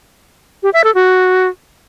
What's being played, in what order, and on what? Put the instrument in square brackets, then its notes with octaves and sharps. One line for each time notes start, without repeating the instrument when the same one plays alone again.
[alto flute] G4
E5
A4
F#4